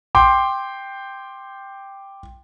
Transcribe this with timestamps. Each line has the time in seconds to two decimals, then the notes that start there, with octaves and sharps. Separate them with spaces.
0.15 G5 C6 D6